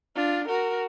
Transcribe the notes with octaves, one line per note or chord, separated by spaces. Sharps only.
D4 F4
F#4 A#4